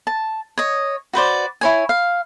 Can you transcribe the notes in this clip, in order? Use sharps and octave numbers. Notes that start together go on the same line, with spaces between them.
A5
C#5 D#5
F#4 B4 C5 D5
E4 C#5 G#5
F5